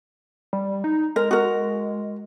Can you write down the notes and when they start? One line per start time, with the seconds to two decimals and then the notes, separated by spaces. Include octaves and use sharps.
0.53 G3
0.84 D#4
1.16 G#3 A#4
1.31 F#4 A#4